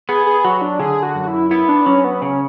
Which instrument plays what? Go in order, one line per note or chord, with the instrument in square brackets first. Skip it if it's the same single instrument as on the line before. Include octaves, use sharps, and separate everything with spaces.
[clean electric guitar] B3 [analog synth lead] G#4
[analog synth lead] G#4
[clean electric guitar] F#3 [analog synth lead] F#4
[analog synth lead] D4
[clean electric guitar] D3 [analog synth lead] G#4
[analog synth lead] F#4
[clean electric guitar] F#2
[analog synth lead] E4
[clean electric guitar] B3 [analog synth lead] E4
[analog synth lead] D4
[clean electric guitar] F#3 [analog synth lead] C#4
[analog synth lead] B3
[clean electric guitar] C#3 [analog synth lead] C#4